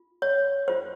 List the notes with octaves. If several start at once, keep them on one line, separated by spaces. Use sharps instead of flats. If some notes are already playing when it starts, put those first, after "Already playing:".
Already playing: F4
C#5
F4 C5